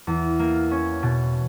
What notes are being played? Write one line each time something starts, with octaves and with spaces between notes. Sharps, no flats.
E2
A#3
C#4
B2